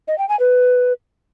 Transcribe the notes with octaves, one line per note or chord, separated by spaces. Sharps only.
D#5
G5
G#5
B4